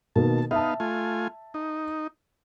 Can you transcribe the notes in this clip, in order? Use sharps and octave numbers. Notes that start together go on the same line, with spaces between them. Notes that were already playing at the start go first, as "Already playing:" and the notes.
B2 D#3 A#3 A5
B3 D#4 E5 F5 A5
A3 F4 G#5
D#4